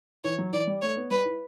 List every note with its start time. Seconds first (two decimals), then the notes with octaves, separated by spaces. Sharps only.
0.24 E3 C#5
0.38 F#3
0.53 E3 D5
0.67 G3
0.82 A3 C#5
0.96 B3
1.11 G3 B4
1.25 E4